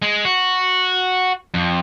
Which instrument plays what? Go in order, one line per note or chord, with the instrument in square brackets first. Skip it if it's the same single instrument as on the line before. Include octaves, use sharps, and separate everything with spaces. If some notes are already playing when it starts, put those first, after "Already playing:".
[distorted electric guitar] G#3
F#4
F2